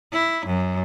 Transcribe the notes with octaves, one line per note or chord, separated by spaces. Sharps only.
E4
F#2